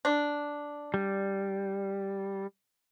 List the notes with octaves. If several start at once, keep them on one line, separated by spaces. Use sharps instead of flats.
D4
G3